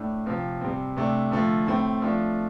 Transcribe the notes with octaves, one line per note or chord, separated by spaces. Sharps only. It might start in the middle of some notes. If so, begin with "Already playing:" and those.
Already playing: A2 A3 D4
C3 F3 C4
C3 G3 C4
C3 A3 D4
D3 F3 A3
A2 A3 C4
F3 A3 D4